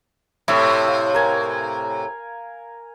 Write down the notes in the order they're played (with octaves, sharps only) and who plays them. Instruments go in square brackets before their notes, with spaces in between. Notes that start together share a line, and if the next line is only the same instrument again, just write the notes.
[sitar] A2 C3 [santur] E4
[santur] F5
A#4 G#5